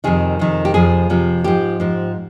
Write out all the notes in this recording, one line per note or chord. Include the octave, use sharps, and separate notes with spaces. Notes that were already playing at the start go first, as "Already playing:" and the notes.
F2 C3 D#3 G#4
F2 C3 D#3
G4
F2 C3 F3 G#4
F2 C3 F3
G#2 F3 G4
G#2 F3